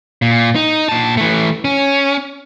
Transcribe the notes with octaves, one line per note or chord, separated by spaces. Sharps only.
A#2
D#4
A#2 A5
E3 A3
C#4